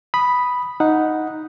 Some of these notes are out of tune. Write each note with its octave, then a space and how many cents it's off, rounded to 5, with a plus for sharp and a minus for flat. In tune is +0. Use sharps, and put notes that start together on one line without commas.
B5 +0 D#6 -5
D#4 +0 F#5 -10